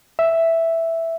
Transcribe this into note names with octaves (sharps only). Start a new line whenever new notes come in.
E5